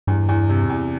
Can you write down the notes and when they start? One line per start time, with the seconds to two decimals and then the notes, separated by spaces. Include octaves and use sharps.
0.07 E2 G2
0.29 E2
0.49 C3
0.70 E2